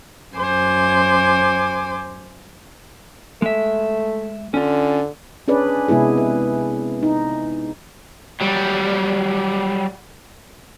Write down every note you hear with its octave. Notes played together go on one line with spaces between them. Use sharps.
F#2 C5 G#5 D6
G#3 A3 E5
D3 C#4 F4
C#4 D4 G#4 B4 D5
C3 G#3 B3 E4 G#4
B4
D#4
F#3 G3